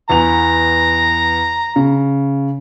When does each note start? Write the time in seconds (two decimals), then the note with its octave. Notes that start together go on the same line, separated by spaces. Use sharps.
0.10 E2 B3 A#5 F7
1.76 C#3